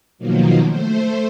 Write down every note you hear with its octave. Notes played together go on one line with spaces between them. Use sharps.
B2 D#3 F3 F#3 A#3
A3 C5